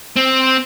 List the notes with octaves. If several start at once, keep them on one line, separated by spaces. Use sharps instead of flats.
C4